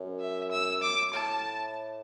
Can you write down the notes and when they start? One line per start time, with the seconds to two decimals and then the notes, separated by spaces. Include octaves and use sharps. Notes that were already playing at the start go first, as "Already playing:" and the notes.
Already playing: F#2
0.21 E5
0.52 E6
0.82 D6
1.13 A2 A5